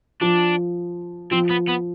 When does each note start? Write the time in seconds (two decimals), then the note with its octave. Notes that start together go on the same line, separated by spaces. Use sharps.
0.21 F3 D4
1.31 F3 C4
1.49 B3
1.68 B3